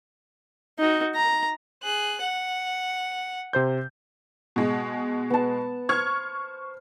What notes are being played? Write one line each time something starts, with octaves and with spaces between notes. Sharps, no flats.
D#4 F#4
A#5
G#4 F#6
F#5
C3 C5 G6
B2 G#3
B3 A5
C5 C#6 F6 G#6